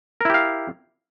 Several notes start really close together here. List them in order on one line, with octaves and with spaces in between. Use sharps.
A#4 E4 G4 F5